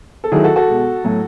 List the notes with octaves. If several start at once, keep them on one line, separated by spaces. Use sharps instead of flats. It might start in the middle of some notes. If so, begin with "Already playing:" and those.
A4
D#3 F#3 A3 E4 G#4
F#4 A4
F#4 A4
B2 G#3
A2 F#3 A3